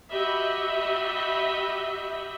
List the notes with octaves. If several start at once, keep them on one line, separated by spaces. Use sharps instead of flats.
F#4 G4 D#5 E5 B5